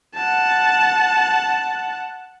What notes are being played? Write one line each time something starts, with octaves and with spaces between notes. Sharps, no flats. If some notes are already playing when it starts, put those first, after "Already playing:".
F#5 A5